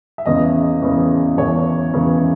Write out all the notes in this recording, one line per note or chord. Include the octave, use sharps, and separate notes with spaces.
E5
E2 C#3 E3 D#5
E2 C#3 E3
E2 C#3 E3 C#5
E2 C#3 E3